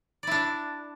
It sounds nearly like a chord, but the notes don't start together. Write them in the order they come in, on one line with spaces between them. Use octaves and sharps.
D5 E4 D4